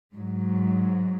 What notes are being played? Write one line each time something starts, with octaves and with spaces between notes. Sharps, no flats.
G#2 F#3